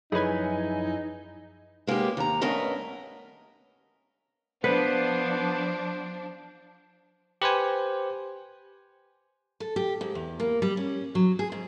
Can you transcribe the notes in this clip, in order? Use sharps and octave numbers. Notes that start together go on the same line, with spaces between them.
F#2 F3 D#4 E4 G#4 B4 C#5 G#5
G#3 A#3 B3 C#4 G4
D#2 A#5
G2 A3 B3 C#4 A#4 D#5
F3 B3 D4 B4 C5
G4 B4 C5 G#5
A4
G4
G#2
E2
A#3
G3
C#4
F#3
G#4
G#2